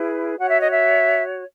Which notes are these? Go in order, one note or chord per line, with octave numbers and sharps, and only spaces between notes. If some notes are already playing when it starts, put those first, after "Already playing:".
Already playing: E4 G#4 B4
F#4 C#5 F#5
E5
D#5
E5